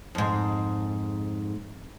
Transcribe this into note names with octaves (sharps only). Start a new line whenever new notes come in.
F2 G#2